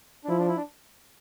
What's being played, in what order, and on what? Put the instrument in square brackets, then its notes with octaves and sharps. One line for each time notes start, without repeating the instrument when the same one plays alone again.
[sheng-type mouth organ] D4
[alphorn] F3 [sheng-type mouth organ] E4
[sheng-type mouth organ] D4
E4
D4